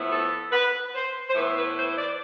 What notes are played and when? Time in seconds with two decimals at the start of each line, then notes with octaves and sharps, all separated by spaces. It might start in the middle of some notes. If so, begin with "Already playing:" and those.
Already playing: A2 F3 B3 E4
0.11 A4
0.52 B4
0.95 C5
1.28 C5
1.35 A2 E3 B3 E4 B4
1.56 B4
1.77 C5
1.97 D5